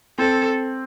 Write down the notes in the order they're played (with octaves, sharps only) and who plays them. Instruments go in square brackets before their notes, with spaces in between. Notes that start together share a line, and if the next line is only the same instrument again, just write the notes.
[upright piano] C4 [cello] A4